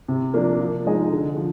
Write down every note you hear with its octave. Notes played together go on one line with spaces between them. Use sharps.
C3
F3 A#3 D4
F3
G#3 D#4 G#4 D#5
D3
F3